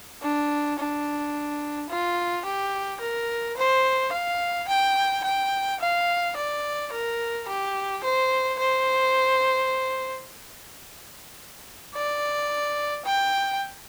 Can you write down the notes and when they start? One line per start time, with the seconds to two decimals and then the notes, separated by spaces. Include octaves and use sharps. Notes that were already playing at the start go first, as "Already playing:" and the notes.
0.22 D4
0.79 D4
1.90 F4
2.45 G4
3.01 A#4
3.57 C5
4.12 F5
4.68 G5
5.24 G5
5.80 F5
6.36 D5
6.92 A#4
7.48 G4
8.04 C5
8.59 C5
11.94 D5
13.06 G5